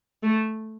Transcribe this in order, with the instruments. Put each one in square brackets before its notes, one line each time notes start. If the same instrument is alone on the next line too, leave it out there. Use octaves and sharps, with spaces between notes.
[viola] A3